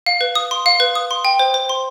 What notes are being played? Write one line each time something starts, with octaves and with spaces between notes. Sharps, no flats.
F5
B4
D#6
C6
F5
B4
D#6
C6
G5
C5
C5
C6